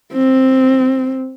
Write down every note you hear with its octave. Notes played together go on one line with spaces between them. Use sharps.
C4